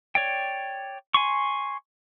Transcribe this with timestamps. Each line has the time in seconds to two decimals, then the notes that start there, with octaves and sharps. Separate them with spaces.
0.15 C#5 D5 G5
1.14 G#5 C6 C#6